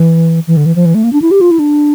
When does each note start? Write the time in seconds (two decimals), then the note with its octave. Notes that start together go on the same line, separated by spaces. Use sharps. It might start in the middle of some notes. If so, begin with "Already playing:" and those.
Already playing: E3
0.47 E3
0.57 D3
0.66 E3
0.76 F3
0.86 E3
0.95 A3
1.04 A#3
1.13 D4
1.22 E4
1.31 G4
1.41 F4
1.51 E4
1.59 D4